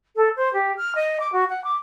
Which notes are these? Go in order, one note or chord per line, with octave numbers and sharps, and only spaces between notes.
A4
C5
G4
F6
D#5
D6
F#4
F#5
D6